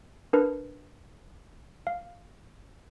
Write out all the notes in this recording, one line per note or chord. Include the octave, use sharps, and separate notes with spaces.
D4 A#4 B4
F5